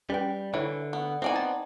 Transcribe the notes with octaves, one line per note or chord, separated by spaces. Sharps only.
G3 C#4 B4 G5
D3 E3 E4 C#5
B3
B3 C4 D#4 D5 G#5
A5 A6